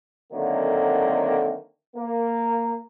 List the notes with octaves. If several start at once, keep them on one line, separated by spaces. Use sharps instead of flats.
D3 D#3 F#3 A3 A#3 C4
A#3